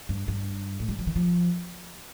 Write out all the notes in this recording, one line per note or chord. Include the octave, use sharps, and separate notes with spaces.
G2
G2
A2
G3
F3
D#3
F3